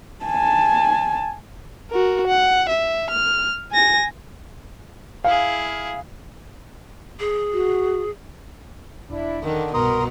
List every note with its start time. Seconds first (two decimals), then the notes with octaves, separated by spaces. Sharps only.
0.24 G#5 A5
1.91 F#4 A#4
2.27 F#5
2.69 E5
3.10 F6
3.72 G#5 A#6
5.24 E4 G#4 F5
7.20 G#4
7.53 F#4
9.10 E1 D4 E4
9.44 D3 D#3
9.74 C2 G2 B2 F#4 A#4 A#5 C6 D#6